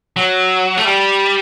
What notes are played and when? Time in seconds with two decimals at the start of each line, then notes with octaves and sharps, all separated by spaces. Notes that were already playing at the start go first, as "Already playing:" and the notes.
0.17 F#3
0.77 A3
0.85 G3